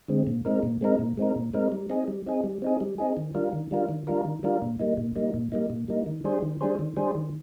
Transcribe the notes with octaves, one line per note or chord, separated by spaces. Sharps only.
D3 G#3 C4
A#2
G#3 C4 D#4 A#4
A#2
G#3 C4 D#4 A#4
A#2
G#3 C4 D#4 A#4
A#2
G#3 C4 D#4 A#4
G3
C4 D#4 G#4
G3
C4 D#4 G#4
G3
C4 D#4 G#4
G3
C4 D#4 G#4
D#3
G3 D4 F4 A#4
D#3
G3 D4 F4 A#4
D#3
G3 D4 F4 A#4
D#3
G3 D4 F4 A#4
A#2
G3 A#3 D#4
A#2
G3 A#3 D#4
A#2
G3 A#3 D#4
A#2
G3 A#3 D#4
D#3
G3 D4 G#4 C5
D#3
G3 D4 G#4 C5
D#3
G3 D4 G#4 C5
D#3